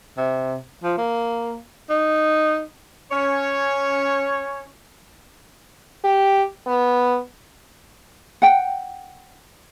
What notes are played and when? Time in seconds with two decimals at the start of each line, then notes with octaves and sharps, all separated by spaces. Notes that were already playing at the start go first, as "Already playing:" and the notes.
0.17 C3
0.83 F3
0.98 A#3
1.90 D#4
3.12 C#4 C#5
6.04 G4
6.67 B3
8.42 F#5 G5